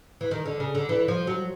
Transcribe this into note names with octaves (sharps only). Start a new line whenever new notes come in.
E3
D#3
D3
C#3
D3
E3
F3
F#3